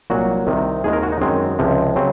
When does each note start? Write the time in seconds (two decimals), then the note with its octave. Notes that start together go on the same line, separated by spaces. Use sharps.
0.10 C2 A#2 F#3 F#4
0.47 C2 C3 D#3
0.84 D#2 D#3 G#3 G#4
0.93 A#4
1.03 F#4
1.12 D#4
1.21 F#2 D#3 G#3 C4
1.59 C#2 C3 F3 G#3
1.96 C#3 F#3 C4